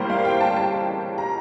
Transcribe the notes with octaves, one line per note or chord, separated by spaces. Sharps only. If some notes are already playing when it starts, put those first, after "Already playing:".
Already playing: A2 G3 A#3 A#4 C5
F5
G5
A5
A5
A#5